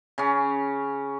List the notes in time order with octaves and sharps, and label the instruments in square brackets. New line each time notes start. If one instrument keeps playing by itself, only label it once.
[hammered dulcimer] C#3 C#4